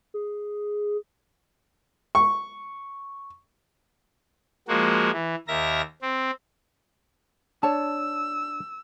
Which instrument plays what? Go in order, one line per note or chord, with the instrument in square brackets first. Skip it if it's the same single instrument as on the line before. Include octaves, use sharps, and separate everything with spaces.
[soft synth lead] G#4
[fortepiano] C#6
[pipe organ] F3 G#3 A#3 F#4
E3
D#2 A#4 E5 A#6
C4
[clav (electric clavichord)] D4 [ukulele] C#5 A5 [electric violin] E6